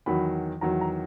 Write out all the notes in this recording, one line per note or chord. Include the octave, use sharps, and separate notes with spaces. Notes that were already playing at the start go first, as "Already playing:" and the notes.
E2 D#3 F#3 B5
E2 D#3 F#3 A#5
A#5